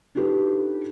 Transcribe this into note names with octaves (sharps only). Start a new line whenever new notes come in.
D4 D#4 F4 G4 A4 B4